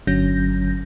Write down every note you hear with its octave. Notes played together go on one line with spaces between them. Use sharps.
G1 D3 F#3 C#4 G6 A#6